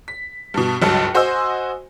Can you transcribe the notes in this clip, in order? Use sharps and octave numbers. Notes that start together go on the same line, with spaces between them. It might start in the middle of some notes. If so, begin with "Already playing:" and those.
B6
G2 B2
F#1 C#2 G2 F#3 A5 C#7
F#4 C5 D#5 G#5 C6 E6